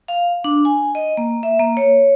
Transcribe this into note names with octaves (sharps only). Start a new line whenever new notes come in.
F5
D4
G#5
D#5
A#3
E5
A#3
C#5